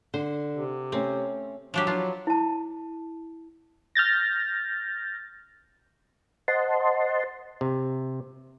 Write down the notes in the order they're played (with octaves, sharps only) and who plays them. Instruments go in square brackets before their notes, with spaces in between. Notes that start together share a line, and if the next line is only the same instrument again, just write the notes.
[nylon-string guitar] D3 [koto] C5
[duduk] C3
[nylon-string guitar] A3 C#4 [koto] C4
[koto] F3 D4 G4 [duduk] F#3
[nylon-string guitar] E3 [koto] D4 F4
[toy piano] E4 A5
[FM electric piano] F6 G6 A6 A#6
[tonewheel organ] C5 D#5 F#5 A5 C6
[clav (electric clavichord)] C3